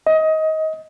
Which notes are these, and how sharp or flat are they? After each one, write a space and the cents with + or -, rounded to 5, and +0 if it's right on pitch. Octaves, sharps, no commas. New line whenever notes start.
D#5 +20